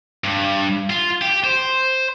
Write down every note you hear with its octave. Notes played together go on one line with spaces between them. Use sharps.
G2
F4
G4
C5